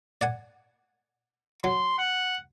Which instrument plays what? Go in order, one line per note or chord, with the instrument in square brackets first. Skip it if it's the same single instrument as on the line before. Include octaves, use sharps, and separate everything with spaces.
[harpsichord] D5 F#5 G#5
[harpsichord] F#3 [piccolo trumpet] C6
[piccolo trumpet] F#5